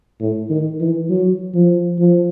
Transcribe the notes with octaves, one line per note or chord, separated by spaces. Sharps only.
A2
D#3
E3
F#3
F3
F3